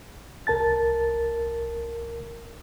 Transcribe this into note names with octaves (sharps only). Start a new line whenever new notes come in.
C2 A#4 A5 A6